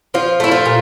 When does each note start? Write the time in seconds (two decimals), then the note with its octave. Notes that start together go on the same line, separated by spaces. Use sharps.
0.14 F3 F4
0.40 A3 E4
0.52 F4
0.66 A#2